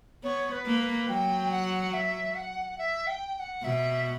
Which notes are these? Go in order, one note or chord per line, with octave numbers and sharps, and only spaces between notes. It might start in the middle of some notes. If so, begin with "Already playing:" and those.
B3 C#5
B4
A#3
B4
F#3 G5
F#5
E5
F#5
E5
G5
G5
F#5
B2 E5